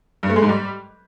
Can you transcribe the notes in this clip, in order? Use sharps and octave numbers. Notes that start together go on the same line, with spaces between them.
G2
A3
G#3
G#2
G3